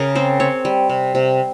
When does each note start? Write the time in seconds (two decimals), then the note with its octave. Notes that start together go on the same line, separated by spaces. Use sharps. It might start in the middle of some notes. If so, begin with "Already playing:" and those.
Already playing: C#3 G#4 A#4
0.15 C4 C5
0.40 C4 C#5
0.65 G3
0.89 C3
1.15 C3